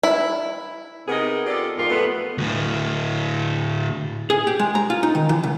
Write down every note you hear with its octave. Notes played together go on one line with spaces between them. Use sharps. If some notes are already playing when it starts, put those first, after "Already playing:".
E4
C3 B3 D#4 G#4 A#4
F4 G4 A4 D5
E2 G#2 F4 G4 A#4
F3 A3 B3
D2 A2
G#4
G4
G#3
A#5
F4
D#4
D#3
E3
C#2